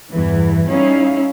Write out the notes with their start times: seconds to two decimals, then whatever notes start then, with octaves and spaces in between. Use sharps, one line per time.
0.12 E2 G2 E3
0.70 G3 C#4 D#4 E4 F5